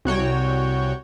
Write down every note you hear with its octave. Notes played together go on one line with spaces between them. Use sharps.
C2 F#4 C#5 G5